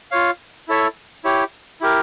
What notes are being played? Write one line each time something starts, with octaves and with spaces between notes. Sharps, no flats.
F4 C#5 F5
E4 A4 C#5 E5
E4 G4 C#5
E4 G4 A#4